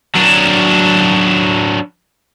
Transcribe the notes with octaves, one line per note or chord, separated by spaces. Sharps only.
F#3 D4